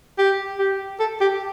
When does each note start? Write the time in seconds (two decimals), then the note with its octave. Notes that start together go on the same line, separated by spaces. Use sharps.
0.18 G4
0.58 G4
0.99 A4
1.21 G4